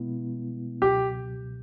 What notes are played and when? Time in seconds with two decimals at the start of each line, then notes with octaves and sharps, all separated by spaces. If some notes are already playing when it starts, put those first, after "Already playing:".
Already playing: B2 G#3 B3 E4
0.81 C#2 B2 F#3 G4